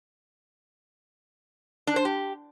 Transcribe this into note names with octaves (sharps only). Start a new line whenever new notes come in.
D4
C5
G4